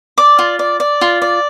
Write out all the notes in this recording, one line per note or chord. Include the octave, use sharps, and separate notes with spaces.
D5 D6
F4
D5
D5
F4
D5